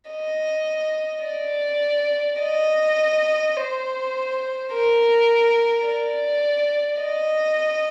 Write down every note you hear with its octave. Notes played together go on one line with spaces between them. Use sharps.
D#5
D5
D#5
C5
A#4
D5
D#5